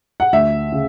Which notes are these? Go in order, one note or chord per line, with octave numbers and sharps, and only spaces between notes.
F#5
D2 E5
C#3